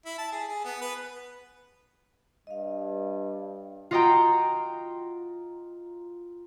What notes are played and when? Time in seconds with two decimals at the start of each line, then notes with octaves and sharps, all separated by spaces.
0.06 E4
0.18 A5
0.32 G#4
0.49 G#4
0.65 B3
0.81 B4
2.47 G2 D#5 F5
3.91 F4 F#4 D#5 F#5 G5 A#5